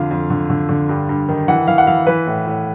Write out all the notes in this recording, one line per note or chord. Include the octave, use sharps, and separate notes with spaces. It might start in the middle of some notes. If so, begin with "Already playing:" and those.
Already playing: F2 D3 F5
F2
D3
D3
D3
G2
G2
D#3
E3 F#5
E3 F5
F#5
E3 F5
E3 B4
A2
A2